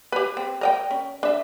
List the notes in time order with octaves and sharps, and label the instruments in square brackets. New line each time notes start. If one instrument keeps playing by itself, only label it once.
[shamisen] G4 B4
C4
A#4 D#5 G5
C#4
D4 E5